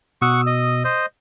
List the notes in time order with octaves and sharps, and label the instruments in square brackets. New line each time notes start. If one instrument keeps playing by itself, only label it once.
[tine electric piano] B2 D#6 E6 [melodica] F#5 C#6
[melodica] D#5
C5 D#5